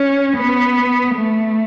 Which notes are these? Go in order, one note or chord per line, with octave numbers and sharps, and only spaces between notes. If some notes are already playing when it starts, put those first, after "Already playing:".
Already playing: C#4
B3
A3